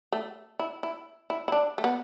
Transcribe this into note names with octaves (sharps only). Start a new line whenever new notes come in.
A3
E4
E4
E4
E4
D4
A3
B3